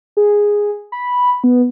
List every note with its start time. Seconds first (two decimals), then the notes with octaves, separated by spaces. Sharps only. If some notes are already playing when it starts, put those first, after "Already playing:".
0.17 G#4
0.92 B5
1.44 B3